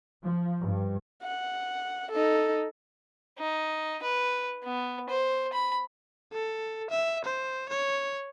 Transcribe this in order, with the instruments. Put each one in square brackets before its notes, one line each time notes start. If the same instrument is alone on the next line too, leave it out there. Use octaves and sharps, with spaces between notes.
[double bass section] F3
G2
[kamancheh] F#5
D#4 A4
[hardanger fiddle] D#4
B4
B3
C5
B5
[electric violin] A4
E5
C5
C#5